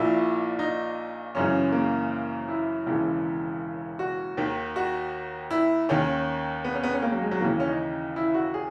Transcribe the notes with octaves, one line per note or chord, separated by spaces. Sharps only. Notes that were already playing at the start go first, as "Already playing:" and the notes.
Already playing: A#1 A#2 E4
D#4
G#1 F#2 C#3 E3 C#4
A#3
E4
E1 D#2 C#3 E3
F#4
D#2 D#3
F#4
E4
D#2 D#3 C#4
B3
C#4
B3
C#4
A#3
F#3
G#3
F#3
D#2 C#3 E3 A#3
C#4
D#4
E4
F#4
G#4